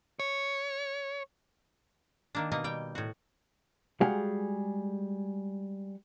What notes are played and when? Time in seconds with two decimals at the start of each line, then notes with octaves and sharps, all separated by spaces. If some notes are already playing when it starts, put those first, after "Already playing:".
0.20 C#5
2.35 D#3 A#3 D4
2.52 B2 A#3 D#5
2.64 G3 G5
2.95 A2 F#4
4.01 G3 G#3 F#4 G#4 F5 F#5